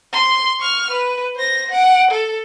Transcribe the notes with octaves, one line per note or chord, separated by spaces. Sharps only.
C6
C#6 F6
B4
C5 A#6
F#5 D7
A4